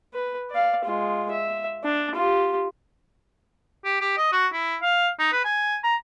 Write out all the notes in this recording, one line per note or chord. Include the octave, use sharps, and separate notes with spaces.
B4
D5 F5
G#3 F4
E5
D4
F4 G4
G4
G4
D#5
F#4
E4
F5
D#4
B4
G#5
A#5